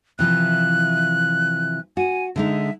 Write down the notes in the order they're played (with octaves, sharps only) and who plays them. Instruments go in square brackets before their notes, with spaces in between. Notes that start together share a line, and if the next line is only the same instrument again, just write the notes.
[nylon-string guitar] C3 E3 F3 [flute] F#6
[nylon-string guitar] F#4 [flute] G#5
[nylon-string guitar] D3 G#3 D#4 [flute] E5